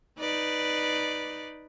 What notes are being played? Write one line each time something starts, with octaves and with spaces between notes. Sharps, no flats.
D#4 B4 D5